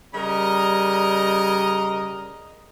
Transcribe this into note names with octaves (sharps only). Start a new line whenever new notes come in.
C#3 G3 A#4 D#5 A#5